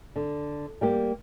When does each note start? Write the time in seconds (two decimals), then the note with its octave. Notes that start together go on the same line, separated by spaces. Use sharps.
0.16 D3
0.81 G3 A#3 G4